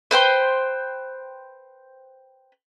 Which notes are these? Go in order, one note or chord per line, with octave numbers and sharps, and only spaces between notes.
B4 C5 G5 C6